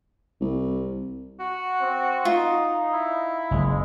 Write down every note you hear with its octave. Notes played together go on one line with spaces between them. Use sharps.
C2
F#4
C4
D#4 F4
E4
F#1 G#3